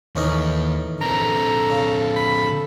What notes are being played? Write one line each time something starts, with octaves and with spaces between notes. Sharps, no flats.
A1 D#2 C#4 D#4
D3 C4 A4 A#5
C#3
B5